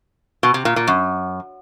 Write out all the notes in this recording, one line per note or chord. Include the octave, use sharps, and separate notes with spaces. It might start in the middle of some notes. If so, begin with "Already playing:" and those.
B2
C3
A#2
A#2
F#2